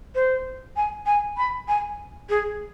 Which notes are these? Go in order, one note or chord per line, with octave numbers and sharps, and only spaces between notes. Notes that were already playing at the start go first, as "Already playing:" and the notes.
C5
G#5
G#5
B5
G#5
G#4